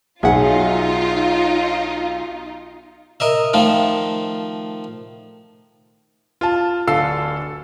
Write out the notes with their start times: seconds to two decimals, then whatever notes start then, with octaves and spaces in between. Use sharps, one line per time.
0.23 B1 D#4 F4 G#4 E5 F#5
3.20 A#4 D#5 E5
3.54 D#3 F3 A3 F4
6.41 F4 A5
6.87 D1 D3 A4 F5 E6 C7